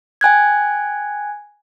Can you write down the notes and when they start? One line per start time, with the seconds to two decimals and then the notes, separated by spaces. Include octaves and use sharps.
0.21 G5 G#5 F#6 G#6